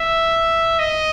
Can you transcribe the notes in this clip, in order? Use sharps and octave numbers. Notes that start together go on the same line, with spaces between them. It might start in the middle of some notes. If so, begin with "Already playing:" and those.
Already playing: E5
D#5